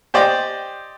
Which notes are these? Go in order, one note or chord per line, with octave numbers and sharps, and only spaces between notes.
G4 C5 D5 D#5 G5